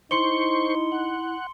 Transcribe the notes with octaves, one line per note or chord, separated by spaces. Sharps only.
D#4 E4 C5 C6 C#6 C#7 G7
F#5